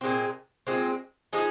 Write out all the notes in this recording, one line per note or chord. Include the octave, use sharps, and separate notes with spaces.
A#2 G#3 C4
A#2 G#3 C4
F3 G#3 D#4 G#4